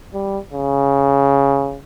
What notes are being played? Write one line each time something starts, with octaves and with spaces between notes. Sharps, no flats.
G3
C#3